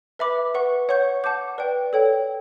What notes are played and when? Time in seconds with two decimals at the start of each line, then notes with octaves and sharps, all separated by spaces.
0.19 B4 E5 B5 D6
0.55 B4 F#5 C#6
0.89 C#5 F#5 C#6 G6
1.24 F#5 A5 D6 G6
1.58 B4 D5 G5
1.93 A4 C#5 G5